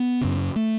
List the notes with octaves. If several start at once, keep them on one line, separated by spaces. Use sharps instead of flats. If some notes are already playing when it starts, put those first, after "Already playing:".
Already playing: B3
F#2 C#3
A3